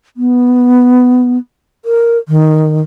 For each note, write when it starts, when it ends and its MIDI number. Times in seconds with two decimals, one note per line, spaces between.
0.17 1.38 59
1.85 2.18 70
2.29 2.81 51